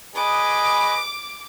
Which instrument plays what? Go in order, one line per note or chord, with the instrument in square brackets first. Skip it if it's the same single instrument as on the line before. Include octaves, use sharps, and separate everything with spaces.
[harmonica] G#4 B4 D#5 [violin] D6